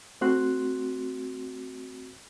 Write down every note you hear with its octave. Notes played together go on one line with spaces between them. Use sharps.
A3 C4 F#4 C6 F#6